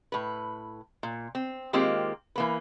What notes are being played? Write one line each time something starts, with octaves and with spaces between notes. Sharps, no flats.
A2 B4
A#2
C4
D#3 G#3 A#3 C4 F4 G4
E3 A#3 B4